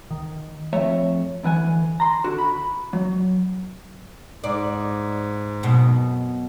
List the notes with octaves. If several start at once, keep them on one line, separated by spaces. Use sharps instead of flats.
D#3
F2 A3 C#5 E5
D2 E3 F#5 G#5
A#5 C6
D3 F#4
B5
F#3
G#2 D5
F#2 B2